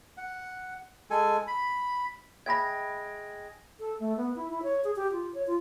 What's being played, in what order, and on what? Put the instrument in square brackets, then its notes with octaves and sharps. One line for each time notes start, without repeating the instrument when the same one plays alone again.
[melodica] F#5
G#3 A4 G#5
B5
[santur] G#3 G5 [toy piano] E5 F5 B5 [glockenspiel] G#6 A#6
[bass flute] A4
A3
B3
E4
E4
C#5
G#4
G4
F4
C#5
F4